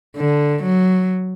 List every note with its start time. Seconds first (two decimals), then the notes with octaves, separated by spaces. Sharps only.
0.17 D3
0.64 F#3